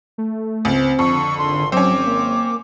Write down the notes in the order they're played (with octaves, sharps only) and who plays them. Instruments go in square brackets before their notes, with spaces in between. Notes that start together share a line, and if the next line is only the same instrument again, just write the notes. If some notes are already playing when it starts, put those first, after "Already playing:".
[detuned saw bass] A3
[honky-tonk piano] C#2 [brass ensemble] C4
[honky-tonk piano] F2 [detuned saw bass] D3 [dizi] C#6
[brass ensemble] G#1 [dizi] C6
[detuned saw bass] F#3 [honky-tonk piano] C4 C#4 [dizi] D6
[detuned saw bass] A#3